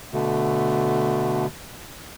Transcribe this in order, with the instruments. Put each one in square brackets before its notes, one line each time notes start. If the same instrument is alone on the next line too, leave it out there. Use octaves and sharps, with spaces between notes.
[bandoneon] B2 D3 A3